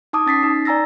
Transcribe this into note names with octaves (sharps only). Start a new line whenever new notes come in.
D#4 A5 D6 D#6
C#4 A6 B6 C7
D#4
D5 G#5 A#5 E6 A6 A#6